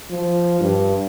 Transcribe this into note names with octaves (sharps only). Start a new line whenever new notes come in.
F3
G2